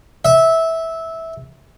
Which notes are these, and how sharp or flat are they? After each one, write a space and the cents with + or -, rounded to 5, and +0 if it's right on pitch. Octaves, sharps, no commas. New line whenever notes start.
E5 -15